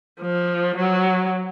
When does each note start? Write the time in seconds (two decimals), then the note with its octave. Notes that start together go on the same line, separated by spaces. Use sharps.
0.21 F3
0.77 F#3